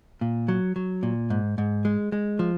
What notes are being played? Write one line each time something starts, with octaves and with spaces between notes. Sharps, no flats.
A#2
F#3
F#3
A#2
G#2
G#2
G#3
G#3
F3